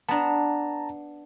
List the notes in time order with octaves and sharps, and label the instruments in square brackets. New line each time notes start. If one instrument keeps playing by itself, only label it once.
[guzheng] B3 D4 [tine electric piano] A5 A#5